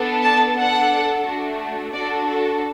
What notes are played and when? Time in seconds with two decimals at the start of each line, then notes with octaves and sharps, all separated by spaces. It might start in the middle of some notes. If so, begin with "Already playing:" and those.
Already playing: B3 D4 A4
0.23 A5
0.58 D4 A4 F#5
1.25 A3 D4 F#4
1.94 D4 F#4 A4 D5
2.28 A4